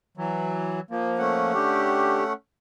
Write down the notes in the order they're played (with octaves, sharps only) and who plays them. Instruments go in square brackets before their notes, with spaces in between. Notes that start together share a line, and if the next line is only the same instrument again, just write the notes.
[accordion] E3 F#3
F3 A#3
[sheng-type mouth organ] A3 C#4 F#5
[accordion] D3 G4